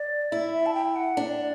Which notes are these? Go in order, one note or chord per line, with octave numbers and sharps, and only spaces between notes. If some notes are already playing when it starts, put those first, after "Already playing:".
Already playing: D5
E4 E5
E5
A5
G5
F#5
D4